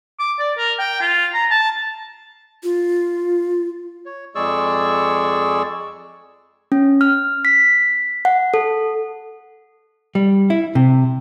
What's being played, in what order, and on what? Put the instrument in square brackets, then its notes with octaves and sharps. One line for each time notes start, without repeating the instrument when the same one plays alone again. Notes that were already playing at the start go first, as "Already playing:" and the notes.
[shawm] D6
D5
A#4
G5
F4
A#5
A5
[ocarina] F4
[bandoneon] C#5
F2 G#3 G#4 D5 C#6 E6
[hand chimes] C#4
F6
B6
F#5
A4
[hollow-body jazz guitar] G3
E4
C3